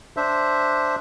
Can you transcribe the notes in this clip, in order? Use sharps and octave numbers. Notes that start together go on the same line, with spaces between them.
D4 C5 E5